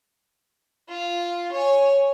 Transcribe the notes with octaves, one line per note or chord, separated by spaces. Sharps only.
F4
C#5 G#5